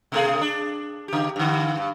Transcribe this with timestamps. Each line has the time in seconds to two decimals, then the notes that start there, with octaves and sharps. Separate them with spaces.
0.12 B2 A3 G#4
0.41 D4
1.08 C#3 G4
1.36 G2 D3
1.77 G2